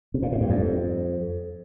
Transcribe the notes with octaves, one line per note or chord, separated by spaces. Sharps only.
C3
A#2
A2
G2
F2